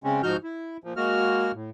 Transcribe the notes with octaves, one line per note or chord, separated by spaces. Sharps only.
C#3 G#3 C4 C#4
G#2 F3 D#4 F#4 F6 G6
E4
A#2 F3
G#3 A#3 F#4 F6
A2